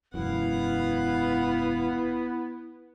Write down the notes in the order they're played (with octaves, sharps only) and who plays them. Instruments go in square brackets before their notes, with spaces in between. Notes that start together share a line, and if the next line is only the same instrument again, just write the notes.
[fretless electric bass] E1 F#2 [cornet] B3 [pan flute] E4 [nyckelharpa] F5 F#5